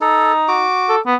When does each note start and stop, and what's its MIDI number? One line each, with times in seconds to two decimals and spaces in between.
0.01 0.67 63
0.01 0.32 69
0.48 0.95 66
0.48 0.95 86
0.89 1.00 69
1.06 1.15 59